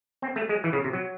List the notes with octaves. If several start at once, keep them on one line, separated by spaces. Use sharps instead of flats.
C4
A3
G#3
E3
C#3
C3
F#3